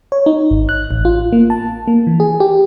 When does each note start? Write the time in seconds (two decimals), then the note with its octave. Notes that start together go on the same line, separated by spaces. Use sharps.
0.12 C#5
0.26 D#4
0.51 G#1
0.69 F#6
0.91 A1
1.05 F4
1.33 A#3
1.50 A5
1.88 A#3
2.07 E3
2.20 G#4
2.40 G4